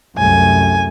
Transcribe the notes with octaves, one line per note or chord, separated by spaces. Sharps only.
C2 F#2 A3 G#5